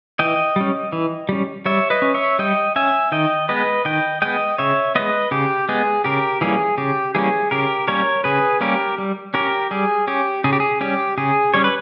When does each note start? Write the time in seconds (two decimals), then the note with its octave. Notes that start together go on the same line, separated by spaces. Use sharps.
0.19 E3 D#5 G5
0.56 G3 C#4
0.92 E3
1.29 G3 C#4
1.66 G3 C#5 E5
1.90 B4 D#5
2.02 C#4
2.14 C#5 E5
2.39 G3 D#5 G5
2.76 C#4 E5 G#5
3.12 D#3 D#5 G5
3.49 G#3 B3 B4 D#5
3.85 D#3 D#5 G5
4.22 G#3 B3 D#5 G5
4.58 C#3 C#5 E5
4.95 G#3 B3 B4 D#5
5.31 C#3 G4
5.69 G#3 B3 G#4
6.04 C#3 G4 A#4
6.41 E3 G3 A#3 C#4 G#4
6.78 C#3 G4
7.15 E3 G3 A#3 C#4 G#4
7.51 C#3 G4 A#4
7.88 G3 A#3 C#4 A#4 C#5
8.24 C#3 G#4 B4
8.61 G3 A#3 C#4 G4 A#4
8.98 G3
9.34 C#4 G4 A#4
9.71 G3 G#4
10.07 C#4 G4
10.44 C#3 G#4
10.53 G4
10.60 G#4
10.81 G3 C#4 G4
11.18 C#3 G#4
11.54 G3 C#4 C#5
11.64 B4